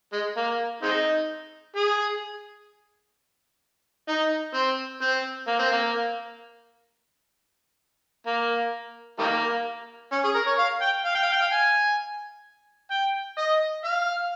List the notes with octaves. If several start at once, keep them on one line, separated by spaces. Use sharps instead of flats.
G#3
A#3
G#3 C4 D#4
G#4
D#4
C4
C4
A#3
C4
A#3
A#3
D#3 G3 A#3
C#4
G#4
A#4
C#5
F5
G5
F5
G5
F5
G5
F5
G#5
G5
D#5
F5